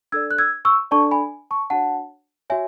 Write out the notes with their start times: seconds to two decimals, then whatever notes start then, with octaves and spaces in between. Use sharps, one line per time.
0.12 D4 A4 D5 E6 G#6
0.31 F#6
0.39 E6 G#6
0.65 C#6 E6
0.91 D4 A4 D5 A5 C#6
1.11 G#5 B5
1.51 A5 C#6
1.70 D4 F#4 C#5 F#5 A5
2.50 F#4 C#5 E5 G#5